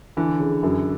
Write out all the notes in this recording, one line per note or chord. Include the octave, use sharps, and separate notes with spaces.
D3 E3
C#3
F#2